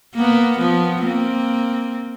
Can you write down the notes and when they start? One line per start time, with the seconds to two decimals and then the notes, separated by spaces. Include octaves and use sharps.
0.14 A#3 B3
0.57 F3 B3
1.02 A#3 C4